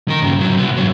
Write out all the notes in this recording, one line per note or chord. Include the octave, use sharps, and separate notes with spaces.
D#3 A#4
G2 C#3
G#2 F#3
C2 B3
G#2 F#3